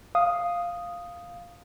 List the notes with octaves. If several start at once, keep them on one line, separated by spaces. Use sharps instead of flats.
F5 D#6